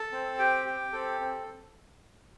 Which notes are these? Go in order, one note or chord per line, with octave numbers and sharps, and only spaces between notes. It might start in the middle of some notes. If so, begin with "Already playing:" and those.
Already playing: A4 A5
C4
G4 G5
G4
C4 A4
C4